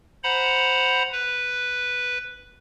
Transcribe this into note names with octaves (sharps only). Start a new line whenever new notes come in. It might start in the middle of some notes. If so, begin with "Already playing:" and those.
C5 F#5 A#5 B5
B4